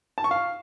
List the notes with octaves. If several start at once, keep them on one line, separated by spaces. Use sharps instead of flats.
A5
C#6
F5